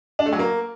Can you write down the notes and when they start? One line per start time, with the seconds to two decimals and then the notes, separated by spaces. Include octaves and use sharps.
0.19 D4
0.26 A3
0.33 F#3
0.39 A#3